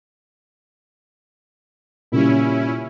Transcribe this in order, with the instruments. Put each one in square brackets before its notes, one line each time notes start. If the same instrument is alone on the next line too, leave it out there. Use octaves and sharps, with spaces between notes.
[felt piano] A#2 C#3 G3 [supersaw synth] C#4 E4